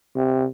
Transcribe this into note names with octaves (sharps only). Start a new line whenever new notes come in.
C3